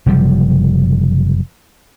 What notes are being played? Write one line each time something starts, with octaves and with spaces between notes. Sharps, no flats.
F#1 C3 F3 G3